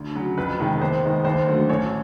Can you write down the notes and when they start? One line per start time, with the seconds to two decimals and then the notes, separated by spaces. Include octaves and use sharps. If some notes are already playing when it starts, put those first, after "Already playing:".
Already playing: D2
0.15 C#3 F#3
0.37 F2 B4
0.58 C3 D#3 G#3 B3
0.81 D#2 C5
1.03 D#3 G#3 B3
1.25 D#2 C5
1.47 D3 F#3 A3
1.69 A1 C#5